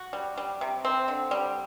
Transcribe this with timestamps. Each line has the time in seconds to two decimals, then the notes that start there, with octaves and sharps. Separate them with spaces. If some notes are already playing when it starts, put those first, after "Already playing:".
Already playing: F#4
0.13 G3
0.37 G3
0.61 C3
0.85 C4
1.08 D3
1.31 G3